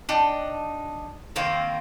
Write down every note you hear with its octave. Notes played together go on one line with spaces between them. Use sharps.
D4 D#4 G5
D#3 A#3 C4